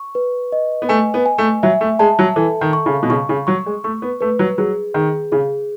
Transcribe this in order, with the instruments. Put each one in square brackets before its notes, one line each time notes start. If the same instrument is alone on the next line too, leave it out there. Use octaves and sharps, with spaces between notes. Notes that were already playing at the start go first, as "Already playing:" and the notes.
Already playing: [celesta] C#6
B4
D#5
[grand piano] B3
[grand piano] A3 [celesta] G#5
[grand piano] B3
[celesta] G#5
[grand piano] A3
[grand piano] F#3 [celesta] E5
[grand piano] A3
[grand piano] G#3 [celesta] A5
[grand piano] F#3
[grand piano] E3 [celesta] A4
[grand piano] D#3
[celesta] C#6
[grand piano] C#3
B2
[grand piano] C#3 [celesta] C#6
[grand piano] C#3
[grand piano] F#3 [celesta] C#6
[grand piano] G#3
[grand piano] A3 [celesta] C#6
[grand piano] B3
[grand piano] A3 [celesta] B4
[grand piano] F#3
[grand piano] F#3 [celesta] G#4
[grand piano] D#3 [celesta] G#4
[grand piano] C#3 [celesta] G#4